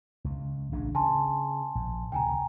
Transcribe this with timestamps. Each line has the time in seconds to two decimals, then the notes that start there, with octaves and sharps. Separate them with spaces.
0.24 C#2
0.72 A1 C#3 D4
0.95 C#3 G#5 A5 C6
1.75 A#1
2.12 D2 C3 G5 G#5 A#5